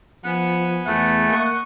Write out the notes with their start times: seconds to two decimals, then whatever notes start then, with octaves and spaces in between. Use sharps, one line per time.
0.24 F3 B3 F#5 G#5
0.86 E2 A3 F#5
1.29 A#3 D#5 C#6